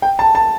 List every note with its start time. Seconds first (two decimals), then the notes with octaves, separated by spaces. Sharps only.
0.02 G5
0.19 A5
0.35 A5